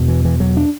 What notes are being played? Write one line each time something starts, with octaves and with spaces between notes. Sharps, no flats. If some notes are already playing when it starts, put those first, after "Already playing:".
Already playing: E2 B2
E3
E3
F#3
D4